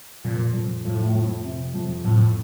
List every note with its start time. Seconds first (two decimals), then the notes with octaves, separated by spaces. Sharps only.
0.24 F2 A#2
0.54 F2
0.85 A2 F3
1.15 F2
1.44 C3
1.74 F2
2.05 F2 A2